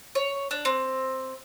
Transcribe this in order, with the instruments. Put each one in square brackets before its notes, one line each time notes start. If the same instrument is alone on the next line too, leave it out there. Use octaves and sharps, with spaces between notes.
[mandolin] C#5
D4
C4